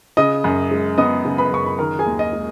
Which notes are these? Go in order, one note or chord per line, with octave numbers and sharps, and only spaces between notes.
C#3 D#5 D#6
F#2
G#3
B3 D#5 D#6
C#3
B4 B5
F#2 C#6
B5
D#3 A#4 A#5
G#4 G#5
D#2
D#5
G#3